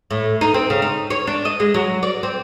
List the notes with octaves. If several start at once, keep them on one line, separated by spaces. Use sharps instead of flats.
A2
D#4
C4
C#3
D#4
C#5
D4
D#5
G#3
F#3
D5
C4